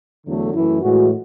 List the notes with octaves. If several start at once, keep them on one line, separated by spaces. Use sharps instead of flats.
E2 D3 F#3 A3
F#2 E3 A3 E4
A2 E3 G#3 F#4